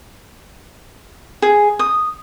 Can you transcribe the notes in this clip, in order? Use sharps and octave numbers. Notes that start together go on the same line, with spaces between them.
G#4
D#6